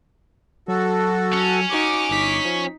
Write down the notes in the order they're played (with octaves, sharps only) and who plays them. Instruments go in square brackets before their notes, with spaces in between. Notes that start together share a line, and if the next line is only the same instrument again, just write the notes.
[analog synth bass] F#3 [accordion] F#4 A4
[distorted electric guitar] C#4
[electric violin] D#4 F#4 [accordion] D6
[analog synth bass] G1 [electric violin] D#4 B6
[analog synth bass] F3